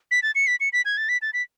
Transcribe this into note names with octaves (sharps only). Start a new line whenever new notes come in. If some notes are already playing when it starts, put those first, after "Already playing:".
B6
A6
C#7
B6
C#7
B6
G#6
A6
B6
A6
B6